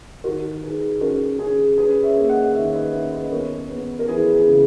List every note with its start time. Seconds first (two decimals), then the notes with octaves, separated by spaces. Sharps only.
0.24 D#3 F#4 A#4
0.63 D#3 G#4 B4
1.00 C#4 F#4 A#4
1.39 C#4 G#4
1.77 C#4 G#4 B4
2.03 C#5 E5
2.16 A#3
2.29 D#5 F#5
2.54 D#3 C#5 E5
2.74 B4 D#5
2.93 C#4 C#5 E5
3.12 B4 D#5
3.31 B3 A#4 C#5
3.70 B3
3.99 A#4
4.08 E3 G#4 B4
4.34 G#4
4.47 C#3